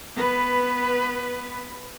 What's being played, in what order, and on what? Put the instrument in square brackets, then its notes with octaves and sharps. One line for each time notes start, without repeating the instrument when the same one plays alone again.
[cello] B3 B4